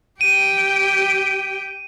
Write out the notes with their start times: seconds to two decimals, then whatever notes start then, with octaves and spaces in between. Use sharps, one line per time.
0.21 G4 G5 D#7